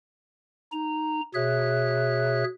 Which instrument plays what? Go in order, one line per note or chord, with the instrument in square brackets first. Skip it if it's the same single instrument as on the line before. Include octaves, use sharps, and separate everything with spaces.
[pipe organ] D#4 A#5
B2 G#4 C#5 E5 F#6